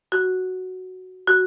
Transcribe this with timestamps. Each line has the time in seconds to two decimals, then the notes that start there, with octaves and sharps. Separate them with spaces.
0.12 F#4
1.27 F#4